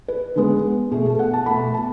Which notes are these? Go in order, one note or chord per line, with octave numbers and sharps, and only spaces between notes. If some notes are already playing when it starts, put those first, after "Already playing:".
B4
D3 G#3 B3
B2 A3 G#4
A4
F#5
A5
B2 A3 B5
A5